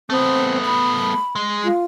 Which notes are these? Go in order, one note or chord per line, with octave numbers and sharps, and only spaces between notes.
A3 B3 C4
B5
G#3
F4